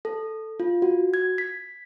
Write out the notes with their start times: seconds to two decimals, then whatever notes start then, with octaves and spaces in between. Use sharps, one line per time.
0.05 A4
0.60 F4
0.82 F#4
1.14 G#6
1.38 B6